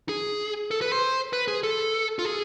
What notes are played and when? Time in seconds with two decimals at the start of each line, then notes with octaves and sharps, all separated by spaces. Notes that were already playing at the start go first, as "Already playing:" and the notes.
0.09 G#4
0.71 A4
0.82 B4
0.92 C5
1.33 B4
1.48 G#4
1.63 A4
2.19 F4
2.25 G#4